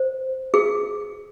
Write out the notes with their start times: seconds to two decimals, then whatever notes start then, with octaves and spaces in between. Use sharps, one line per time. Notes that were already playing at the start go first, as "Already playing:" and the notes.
Already playing: C5
0.54 G#4